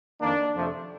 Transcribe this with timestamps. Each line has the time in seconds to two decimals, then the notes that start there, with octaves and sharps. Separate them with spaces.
0.20 F2 D#3 A#3 D4
0.56 F2 C3 F3 A3